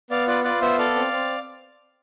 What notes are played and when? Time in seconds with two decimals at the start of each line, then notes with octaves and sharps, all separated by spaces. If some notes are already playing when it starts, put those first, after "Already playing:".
0.10 B3 D5 F5
0.27 F4 B4 D5
0.44 F4 B4 D5
0.61 B3 C5 E5
0.78 A4 D5 F5
0.95 C4
1.12 C4